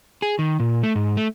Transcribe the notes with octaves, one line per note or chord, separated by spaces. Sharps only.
G#4
D#3
A#2
A3
G#2
A3